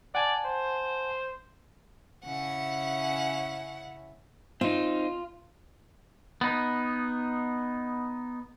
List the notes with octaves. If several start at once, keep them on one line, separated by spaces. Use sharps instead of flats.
D5 F#5 G#5 A5
C5
C#3 C#4 E4 F#5
C4 D#4 F4
B3 D#4